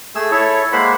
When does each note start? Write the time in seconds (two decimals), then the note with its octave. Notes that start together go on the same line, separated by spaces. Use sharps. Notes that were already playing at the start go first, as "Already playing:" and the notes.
0.15 A3 G#4 E6
0.31 E4 A4 C#5
0.72 G#3 A#3 C5 E5 F#5 B5